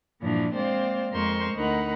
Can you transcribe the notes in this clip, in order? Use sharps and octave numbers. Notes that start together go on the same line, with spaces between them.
G2 A#2 E3 F3 D4
G#3 A#3 C4 C5 D5 F5
F2 G#3 A#4 C5 C6 C#6
D2 D#4 A#4 F#5 B5